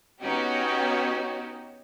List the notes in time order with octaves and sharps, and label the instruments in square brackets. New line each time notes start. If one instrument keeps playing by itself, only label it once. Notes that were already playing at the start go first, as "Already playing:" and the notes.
[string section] B3 C#4 D#4 F#4 G4